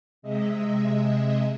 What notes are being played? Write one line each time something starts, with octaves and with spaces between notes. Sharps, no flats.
C3 G#3 D#5 E5